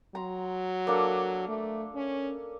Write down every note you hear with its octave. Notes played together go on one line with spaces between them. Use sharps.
F#3 A#5 C6
A#3 D4 A4
A3
C#4